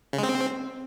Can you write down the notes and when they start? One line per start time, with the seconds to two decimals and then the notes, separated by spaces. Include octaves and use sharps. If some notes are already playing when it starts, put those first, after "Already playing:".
0.13 C#3
0.18 G#3
0.23 C4